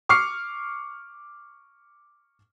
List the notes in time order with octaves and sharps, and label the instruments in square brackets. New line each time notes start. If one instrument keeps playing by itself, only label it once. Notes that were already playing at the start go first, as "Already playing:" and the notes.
[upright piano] C#6 D6 F6 C7 C#7